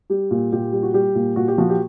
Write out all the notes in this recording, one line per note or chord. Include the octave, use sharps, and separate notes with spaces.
G3 G4
A#2
A#2 G4
G3
F#4
G3 G4
A#2
A#2 F#4
G4
F3 F#4
G4